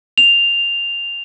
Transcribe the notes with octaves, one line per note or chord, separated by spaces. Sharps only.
F7